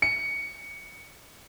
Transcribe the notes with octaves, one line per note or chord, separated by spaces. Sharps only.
C#7